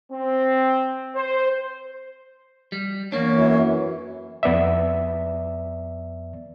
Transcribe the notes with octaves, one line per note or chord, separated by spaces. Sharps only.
C4
C5
G3
E2 A#3 D4 C#5
F#2 E3
F2 B3 D5 E5